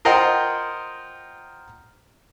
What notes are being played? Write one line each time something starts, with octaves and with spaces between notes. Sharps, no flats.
F4 A#4 C5 D#5 F#5 G5